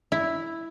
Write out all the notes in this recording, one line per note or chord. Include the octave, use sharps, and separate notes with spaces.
E4